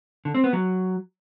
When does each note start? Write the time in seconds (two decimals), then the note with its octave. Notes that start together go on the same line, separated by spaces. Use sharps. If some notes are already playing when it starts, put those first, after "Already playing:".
0.25 D3
0.34 C4
0.44 B3
0.53 F#3